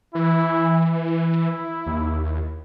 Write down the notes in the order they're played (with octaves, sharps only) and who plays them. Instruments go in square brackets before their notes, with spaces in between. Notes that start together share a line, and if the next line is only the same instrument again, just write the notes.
[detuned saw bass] E3 [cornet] E4
[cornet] E4
[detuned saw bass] D#2